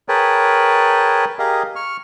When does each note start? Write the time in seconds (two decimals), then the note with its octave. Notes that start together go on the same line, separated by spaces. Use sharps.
0.09 G#4 A#4 B4 C#5 G5 A5
1.39 G4 G#4 A#4 D#5 F5
1.76 C#6 F6